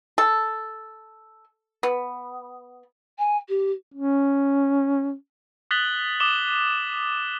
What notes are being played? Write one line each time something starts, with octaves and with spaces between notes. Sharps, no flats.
A4
B3
G#5
G4
C#4
D#6 F#6 A6 B6 F#7 G7
D6 D#6 E7 G7